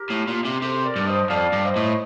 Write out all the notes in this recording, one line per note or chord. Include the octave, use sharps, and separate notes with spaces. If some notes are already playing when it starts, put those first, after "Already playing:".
Already playing: G4 A#4
A2
A#2
C3
C3 A4 C5
A#4 D5
G2
C5 D#5
F2 D5 F5
G2
C5 D#5
A2